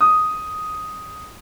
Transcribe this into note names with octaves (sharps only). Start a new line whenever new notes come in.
D#6